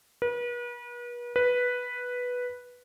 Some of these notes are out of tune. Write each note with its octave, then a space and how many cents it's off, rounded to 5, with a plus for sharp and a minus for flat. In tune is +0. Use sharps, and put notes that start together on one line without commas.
B4 -40
B4 -5